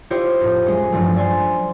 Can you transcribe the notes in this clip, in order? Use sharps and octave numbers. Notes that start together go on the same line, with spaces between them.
E4 F4 G4 C5 C#5 D#5
F2 A2
F#3 G#3 C#4
A1 G2 F3 F#3 A3
D5 G#5 C6